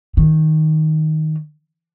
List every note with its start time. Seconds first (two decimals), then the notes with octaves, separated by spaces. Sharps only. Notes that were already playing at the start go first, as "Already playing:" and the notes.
0.17 D#3